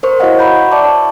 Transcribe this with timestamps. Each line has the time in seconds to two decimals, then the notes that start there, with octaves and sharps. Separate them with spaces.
0.03 A#4 C5 C#6
0.20 E4 F#4 C#5 D#5 F5 F#5
0.39 F#5 A#5 B5 C#6 G6
0.71 D5 E5 A5 C#6 D6